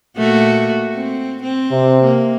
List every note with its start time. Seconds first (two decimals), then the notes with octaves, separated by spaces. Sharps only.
0.17 A#2 A3 F#4
0.94 C4
1.42 C4
1.71 C3
2.03 A#3